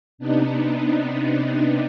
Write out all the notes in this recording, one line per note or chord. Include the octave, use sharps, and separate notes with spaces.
C3 B3 D4 D#4